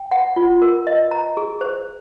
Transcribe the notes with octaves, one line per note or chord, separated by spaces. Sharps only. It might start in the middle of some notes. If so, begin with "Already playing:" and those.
Already playing: G5
F#5
F4
A#4
D#5
A#5
G#4
C5